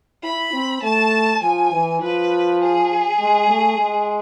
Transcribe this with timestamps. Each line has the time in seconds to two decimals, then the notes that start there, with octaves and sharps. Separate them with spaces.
0.24 E4 B5
0.54 C4
0.83 A3 A5
1.42 F3 G#5
1.72 E3
2.02 F3 B4
2.61 G#4
3.20 G#3
3.49 A3
3.79 G#3